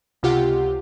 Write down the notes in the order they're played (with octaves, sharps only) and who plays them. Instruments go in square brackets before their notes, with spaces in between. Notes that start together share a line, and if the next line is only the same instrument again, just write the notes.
[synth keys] C#2 C3 F4 G4 F#5